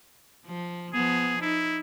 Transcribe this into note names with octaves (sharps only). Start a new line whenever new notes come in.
F3
F3 B3 G#4
D#4 E4